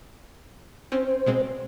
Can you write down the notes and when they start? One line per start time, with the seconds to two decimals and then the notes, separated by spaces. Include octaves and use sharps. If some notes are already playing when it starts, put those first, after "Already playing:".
0.92 C4 C#4 C5
1.26 B2 G#3 C4